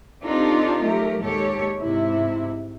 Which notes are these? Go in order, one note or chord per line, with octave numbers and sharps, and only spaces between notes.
C4 D4 D#4 F4 G4 A4
F#3 A3 G4 A#4
D#2 A#2 G#3 G4 A4 C#5
G#2 C3 E4